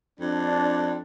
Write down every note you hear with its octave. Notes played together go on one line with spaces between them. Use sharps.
F2 D4